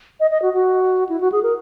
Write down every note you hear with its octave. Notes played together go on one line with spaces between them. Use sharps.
D#5
D#5
F#4
F#4
E4
F#4
G#4
A#4